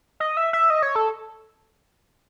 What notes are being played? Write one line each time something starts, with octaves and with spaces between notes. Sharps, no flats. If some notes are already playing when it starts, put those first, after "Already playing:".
D#5
E5
E5
D#5
C#5
A4